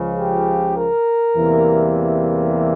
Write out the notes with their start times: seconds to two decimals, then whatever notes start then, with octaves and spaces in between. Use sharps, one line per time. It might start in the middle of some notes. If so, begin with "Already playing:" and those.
Already playing: C#2 C#3 F3
0.19 G4
0.78 A#4
1.36 E2 C3 E3 G3 A#3